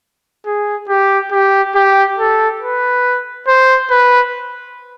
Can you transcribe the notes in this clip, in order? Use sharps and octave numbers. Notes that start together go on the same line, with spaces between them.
G#4
G4
G4
G4
A4
B4
C5
B4